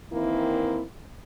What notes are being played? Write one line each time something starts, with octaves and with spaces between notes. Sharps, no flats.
D#3 E3 A#3 C4 E4